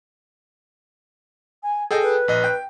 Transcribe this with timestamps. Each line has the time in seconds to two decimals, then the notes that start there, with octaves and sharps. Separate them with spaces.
1.63 G#5
1.91 G#4 A4 D#5 G5
2.02 B4
2.28 A#1 D#5
2.44 G5